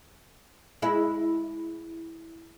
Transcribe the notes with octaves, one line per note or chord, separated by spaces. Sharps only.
G#3 E4